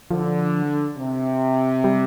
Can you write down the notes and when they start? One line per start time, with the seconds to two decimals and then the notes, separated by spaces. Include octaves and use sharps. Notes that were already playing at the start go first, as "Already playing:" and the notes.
0.11 D3 F3
0.97 C3
1.84 G3